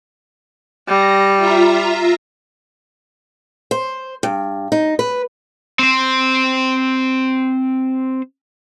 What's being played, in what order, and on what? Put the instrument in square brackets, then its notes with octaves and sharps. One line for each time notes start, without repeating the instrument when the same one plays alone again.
[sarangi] G3 [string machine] A#6
[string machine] F4 E5 A#5
[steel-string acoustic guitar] C5
G2
D#4
B4
[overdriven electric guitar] C4 C5